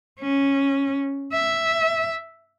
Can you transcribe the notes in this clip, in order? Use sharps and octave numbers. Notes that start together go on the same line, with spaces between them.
C#4
E5